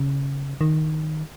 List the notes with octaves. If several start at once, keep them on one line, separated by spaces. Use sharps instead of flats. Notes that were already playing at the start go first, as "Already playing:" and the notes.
Already playing: C#3
D#3